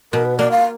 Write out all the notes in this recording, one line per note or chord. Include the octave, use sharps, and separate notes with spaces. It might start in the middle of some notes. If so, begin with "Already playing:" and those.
B2 A#4
B4
A#3 D5
F5